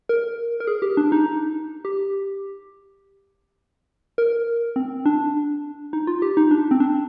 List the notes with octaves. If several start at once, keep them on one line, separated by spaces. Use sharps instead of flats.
A#4
A#4
G#4
G4
D4
D#4
G4
A#4
C4
D4
D#4
F4
G4
D#4
D4
C4
D4